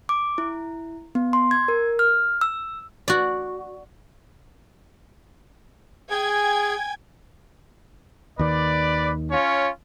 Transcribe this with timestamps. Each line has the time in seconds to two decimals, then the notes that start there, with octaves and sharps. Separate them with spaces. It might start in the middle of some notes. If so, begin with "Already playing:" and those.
0.09 D6
0.38 E4
1.15 B3
1.33 C6
1.51 G#6
1.68 A#4
1.99 F6
2.41 E6
3.08 F#4 D5
6.11 G#4 G5 G#5 G#6
8.39 D#2 D#3 B4 D5
9.31 C#4 F4 C#5